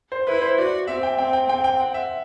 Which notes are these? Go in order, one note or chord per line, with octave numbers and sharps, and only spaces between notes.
C5
E4 B4
C5
F#4 D5
C4 E5
G5
C4 G5
G5
C4 G5
G5
F#5
E5